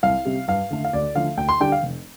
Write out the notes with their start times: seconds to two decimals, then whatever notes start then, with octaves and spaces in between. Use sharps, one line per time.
0.03 C2 F5
0.25 C3 G3
0.48 G2 F5
0.71 D3 A3
0.85 F5
0.93 D2 D5
1.15 D3 F3 A3 F5
1.37 D2 G5
1.49 C6
1.60 D3 G3 D4 G5
1.72 F5
1.83 F1